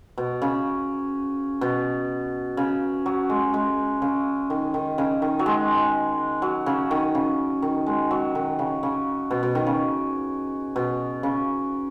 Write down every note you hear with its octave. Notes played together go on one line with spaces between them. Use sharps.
B2
C#3
B2
C#3
F#3
G#3
G#3
C#3
D#3
D#3
C#3
D#3
F#3
G#3
F#3
C#3
D#3
C#3
D#3
G#3
F#3
D#3
C#3
C#3
B2
B2
D#3
C#3
B2
C#3